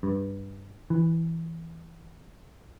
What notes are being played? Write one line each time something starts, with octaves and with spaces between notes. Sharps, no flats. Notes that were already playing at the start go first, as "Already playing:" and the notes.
G2
E3